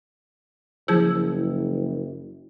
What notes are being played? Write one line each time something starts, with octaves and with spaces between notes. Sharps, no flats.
F#1 F3 E4 G#4